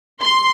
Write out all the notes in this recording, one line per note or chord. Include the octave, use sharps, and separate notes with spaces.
C6